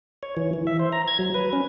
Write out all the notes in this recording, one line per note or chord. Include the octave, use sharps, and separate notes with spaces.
C#5
E3
E3
E5
C5
A#5
G#6
F#3
B4
C#4